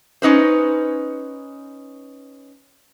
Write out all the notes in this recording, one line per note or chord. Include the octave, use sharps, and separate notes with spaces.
C#4 D#4 B4 C5